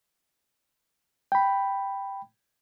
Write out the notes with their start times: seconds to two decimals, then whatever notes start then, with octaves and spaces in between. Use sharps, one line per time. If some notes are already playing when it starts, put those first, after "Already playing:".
1.32 G5 B5